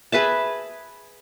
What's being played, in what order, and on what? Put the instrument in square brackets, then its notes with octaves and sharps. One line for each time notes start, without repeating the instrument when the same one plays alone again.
[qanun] G#4 B4 E5 A5